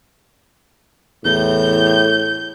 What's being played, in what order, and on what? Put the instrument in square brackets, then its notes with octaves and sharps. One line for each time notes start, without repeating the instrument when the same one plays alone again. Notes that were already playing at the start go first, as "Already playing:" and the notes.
[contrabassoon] E2 [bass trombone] A2 [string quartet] G6